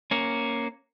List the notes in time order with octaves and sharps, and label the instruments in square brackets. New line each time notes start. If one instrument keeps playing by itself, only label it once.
[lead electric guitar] A#3 C#4